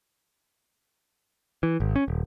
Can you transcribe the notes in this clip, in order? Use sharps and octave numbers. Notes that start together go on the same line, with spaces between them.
E3
G#1
C#4
D#1